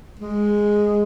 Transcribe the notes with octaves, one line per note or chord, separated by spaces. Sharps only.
G#3